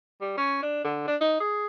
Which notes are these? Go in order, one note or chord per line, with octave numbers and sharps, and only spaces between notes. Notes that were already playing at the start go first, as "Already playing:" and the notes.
G3
C#4
D4
D3
D4
D#4
G#4